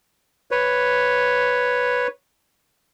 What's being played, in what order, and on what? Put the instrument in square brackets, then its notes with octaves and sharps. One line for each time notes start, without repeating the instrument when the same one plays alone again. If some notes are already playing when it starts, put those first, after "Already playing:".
[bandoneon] B4 C#5